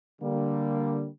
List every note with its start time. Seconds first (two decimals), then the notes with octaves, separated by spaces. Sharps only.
0.21 D3 G3 A#3